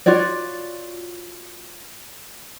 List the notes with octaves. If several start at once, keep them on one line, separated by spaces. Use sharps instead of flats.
F4 F#4 C#5 D5